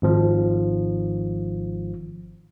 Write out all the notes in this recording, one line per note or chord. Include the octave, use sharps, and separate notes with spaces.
G#1 F3